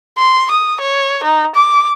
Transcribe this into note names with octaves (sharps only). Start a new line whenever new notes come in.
C6
D#6
C#5
D#4
D6